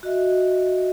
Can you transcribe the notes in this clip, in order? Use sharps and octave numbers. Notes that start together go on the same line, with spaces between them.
F#4 D#5 E5